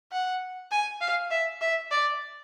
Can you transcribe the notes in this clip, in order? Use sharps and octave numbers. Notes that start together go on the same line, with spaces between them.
F#5
G#5
F5
E5
E5
D5